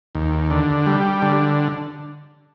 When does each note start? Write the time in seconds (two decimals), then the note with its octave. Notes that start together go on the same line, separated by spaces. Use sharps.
0.15 D#2
0.50 D3
0.86 G3
1.22 D3